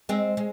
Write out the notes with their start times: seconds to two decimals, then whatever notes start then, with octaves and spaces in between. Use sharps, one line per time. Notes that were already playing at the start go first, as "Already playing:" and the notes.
0.09 G#3 C4
0.37 G#3